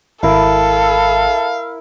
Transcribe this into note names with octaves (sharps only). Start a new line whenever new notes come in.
G#1 E4 A4 A#4 F5